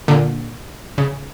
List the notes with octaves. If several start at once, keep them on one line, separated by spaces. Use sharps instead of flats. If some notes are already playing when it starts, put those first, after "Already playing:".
A#2 D3
C#3